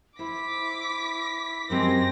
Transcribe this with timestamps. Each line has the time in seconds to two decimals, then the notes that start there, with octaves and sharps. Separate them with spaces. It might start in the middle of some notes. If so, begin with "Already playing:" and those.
0.19 E4 C5 D6 B6
1.70 F#2 F#3 G#3 C4 G4 A#6